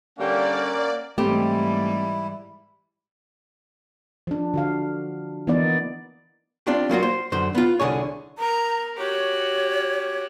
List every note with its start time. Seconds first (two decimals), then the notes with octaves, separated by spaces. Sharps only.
0.19 D3 G3 A#3 C#4 G4 D5 F#5
1.18 G#2 E3 G3 A3 C4 E4 G4
4.27 F3 D4
4.54 D3 F#4 F5
5.47 E3 A#3 B3 D#4 D5
6.67 C4 D4 F4 G4
6.89 F#3 A#3 F4 F#4
7.03 C5
7.32 F#2 D3 C5
7.55 B3 F4
7.80 C2 D3 G#4 C#5
8.38 A#4 A#5
8.98 F#4 G4 C#5